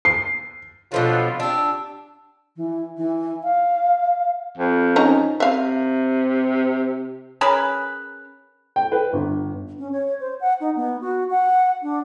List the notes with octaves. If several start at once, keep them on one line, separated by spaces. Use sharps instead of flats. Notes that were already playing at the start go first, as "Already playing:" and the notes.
C7
B2 F3 F#3 D4 F4 A4 B4
D4 G4 E6
E3
E3
F5
F2
C#4 D#4 A#5
C3 E5 F5
C#4 G#4 A#4 B4
G5
B4
G1
C#4
C#5
C5
F#5
D#4
B3
F#4
F#5
D4